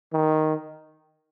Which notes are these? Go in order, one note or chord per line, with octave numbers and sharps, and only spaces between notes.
D#3